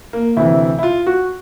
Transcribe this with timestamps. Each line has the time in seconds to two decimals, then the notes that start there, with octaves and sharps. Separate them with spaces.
0.13 A#3
0.37 D2 C3 E3 E4
0.79 E4
0.83 F4
1.07 F#4